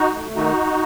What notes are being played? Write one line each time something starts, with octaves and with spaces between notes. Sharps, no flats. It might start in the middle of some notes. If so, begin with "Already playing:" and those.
Already playing: D#4 F#4
A3
D#3 D#4 F#4